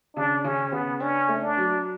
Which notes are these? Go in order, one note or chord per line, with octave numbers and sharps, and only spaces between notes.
C#3 D4
C#3 C#4
C#3 B3
C#4 D4
A3
D4
F#3